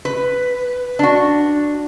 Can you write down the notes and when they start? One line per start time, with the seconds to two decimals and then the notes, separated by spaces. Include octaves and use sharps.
0.05 B4
0.99 D4 F#4